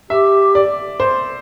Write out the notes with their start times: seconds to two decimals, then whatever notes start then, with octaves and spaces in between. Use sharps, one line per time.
0.10 G4 E5
0.55 D5
1.00 C5